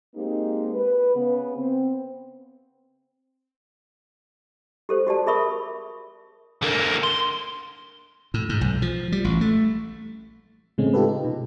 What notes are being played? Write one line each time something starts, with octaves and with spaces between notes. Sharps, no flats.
G#3 A#3 C4 D#4 G4
B4
C#3 B3
C4
G4 A4 C5
F#4 G4 D5 A5
G#4 A#4 E5 B5 C#6 D#6
D3 A#3
C6
A2
G#2
B1
F3
G3
A1
A3
A2 C#3 G#3 A3 C4 C#4
D#4 F4 G4 A4 B4
D#4
B2